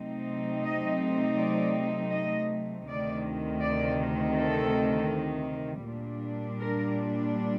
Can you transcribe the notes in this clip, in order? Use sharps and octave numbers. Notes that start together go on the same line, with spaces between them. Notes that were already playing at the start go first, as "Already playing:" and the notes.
Already playing: C3 F#3 A3 C4 D#4
D#5
D5
D#5
D2 C3 D#3 D5
D5
A4
A#2 G3 D4
A#4